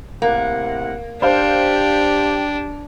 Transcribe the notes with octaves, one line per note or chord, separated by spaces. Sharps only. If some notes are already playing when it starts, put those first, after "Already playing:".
A2 C3 A#3 F#5
D4 G4 C5 F5